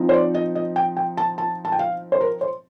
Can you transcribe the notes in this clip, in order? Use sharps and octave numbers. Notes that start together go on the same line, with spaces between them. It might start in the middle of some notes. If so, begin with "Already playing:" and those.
Already playing: F3 C4 D#4
C5
D5
D#5
D#5
G5
G5
A5
A5
A5
G5
F5
C5
A#4
C5